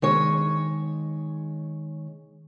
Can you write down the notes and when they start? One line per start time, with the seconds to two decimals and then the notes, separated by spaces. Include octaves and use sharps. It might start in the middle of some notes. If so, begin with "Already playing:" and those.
0.02 D#3 G#3 C#5